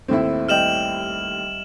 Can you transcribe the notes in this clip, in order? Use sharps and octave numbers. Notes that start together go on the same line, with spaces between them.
D#2 A2 A3 C4 E4
G3 D#5 G5 F6 E7 F#7